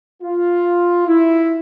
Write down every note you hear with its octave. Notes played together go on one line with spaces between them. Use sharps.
F4
E4